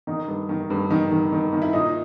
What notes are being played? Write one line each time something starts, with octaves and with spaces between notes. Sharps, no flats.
D#3 D#4
G2
D#3
G2
D#3
D#3
D#3
D#3
E4
A#2 D#4